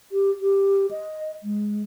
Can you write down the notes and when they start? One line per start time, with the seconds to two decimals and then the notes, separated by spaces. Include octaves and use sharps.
0.12 G4
0.41 G4
0.91 D#5
1.43 G#3